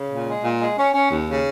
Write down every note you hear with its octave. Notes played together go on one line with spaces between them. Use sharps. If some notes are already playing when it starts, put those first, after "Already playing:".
Already playing: C#3
A#2
G#3
A#2
G#3
C#4
C#4
D#2
C#3